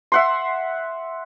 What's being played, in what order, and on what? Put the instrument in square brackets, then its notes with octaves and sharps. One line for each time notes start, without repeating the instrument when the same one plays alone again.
[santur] E5 F#5 C6